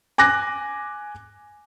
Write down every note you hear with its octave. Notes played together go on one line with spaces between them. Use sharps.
G#5 D6 F#6 A#6